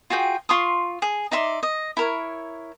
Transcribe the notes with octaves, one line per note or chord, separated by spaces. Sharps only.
F4 F#4 G#4 G5
F4 C6 C#6 D#6
G#4
D#4 D5 E5 C6
D#5
E4 A#4 C#5